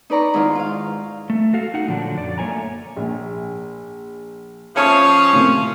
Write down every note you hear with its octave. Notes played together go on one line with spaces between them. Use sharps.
D#4 B4 D5 A#5 C#6
G#2 D#3 E4 F4 C6
F4 F5
A3
F#4 A4 F5
D#4 F#5
A#2 D3 F3 F#3 D4
F#2 D5
A3 A#3 C#5 G#5 A#5
A#1
F3 C#4 C#5 E5 F5 A5 D#6
A2 C3 A#3